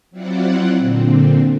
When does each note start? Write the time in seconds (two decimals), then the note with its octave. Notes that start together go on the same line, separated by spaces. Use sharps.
0.11 F#3 C4 E4 F4 D5 F#5
0.78 A#2 D3 C4